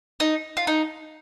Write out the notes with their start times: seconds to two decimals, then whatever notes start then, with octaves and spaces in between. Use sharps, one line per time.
0.20 D#4
0.57 F4
0.67 D#4